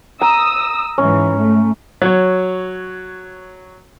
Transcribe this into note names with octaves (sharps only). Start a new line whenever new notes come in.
A#5 D#6 E6
G#2 E3 C#4
A3
F#3 C#5